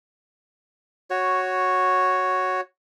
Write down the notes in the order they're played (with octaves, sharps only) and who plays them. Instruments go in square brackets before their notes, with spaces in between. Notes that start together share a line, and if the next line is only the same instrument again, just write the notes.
[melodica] F#4 C#5